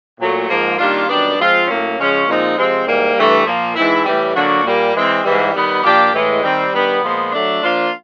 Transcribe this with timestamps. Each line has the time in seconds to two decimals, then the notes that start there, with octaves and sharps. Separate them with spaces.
0.19 A#2 F#3 A3
0.48 G#2 F3 A#3
0.78 D#3 G3 A#3 D4 F4
1.08 F#2 D#3 G3 B3 D4
1.37 F3 G#3 C4 F4
1.67 A2 F#3 A#3 C#4
1.97 C#3 F3 G#3 C#4
2.27 A#2 F3 G#3 C4 D#4
2.56 C3 F3 G#3 C4
2.86 G#2 E3 G3 A#3
3.16 G2 E3 A3
3.45 A#2 F3 A#3
3.75 G#2 E3 G#3 C4 E4
4.04 A2 E3 G3
4.34 D3 F#3 A#3 D4 F#4
4.64 A#2 G3 A#3
4.94 E3 G#3 C4
5.23 G#2 E3 G3
5.54 D#3 G3 B3
5.83 A#2 F3 A#3 D4 G4
6.13 A2 E3 G#3
6.42 D#3 G3 C4
6.73 G2 D#3 G3 B3
7.02 A#2 F3 G#3 B3
7.32 F#3 A3 D4
7.61 F3 A#3 D4 F4